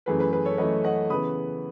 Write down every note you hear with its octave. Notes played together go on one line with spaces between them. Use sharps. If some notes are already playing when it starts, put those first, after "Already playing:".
F#2 E3 A3 G#4 B4
G#4 B4
G#4 B4
A4 C#5
F#2 E3 A3 B4 D#5
D#5 F#5
C#3 E3 B3 B5 D#6